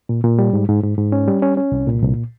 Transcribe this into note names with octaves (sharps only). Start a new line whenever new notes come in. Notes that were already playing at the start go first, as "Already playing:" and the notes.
A#2
A#2
G3
G#2
G#2
G#2
G#2
C#4
G3
C#4
C#4
C2
A#2
C2